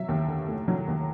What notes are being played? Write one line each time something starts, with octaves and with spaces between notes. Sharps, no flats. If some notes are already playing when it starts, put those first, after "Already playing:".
Already playing: F#3 E5
D#2
D3
A3
F#3
D#2